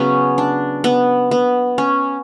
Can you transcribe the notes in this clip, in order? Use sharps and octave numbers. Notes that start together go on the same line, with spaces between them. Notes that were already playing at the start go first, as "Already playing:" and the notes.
Already playing: C#3 F#3 B3 C#4
D4
B3
B3
C#4